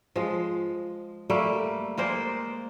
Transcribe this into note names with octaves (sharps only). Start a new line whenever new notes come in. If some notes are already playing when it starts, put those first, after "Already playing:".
F3 G#3
G3 A3 A#3
G#3 A#3 C5 D5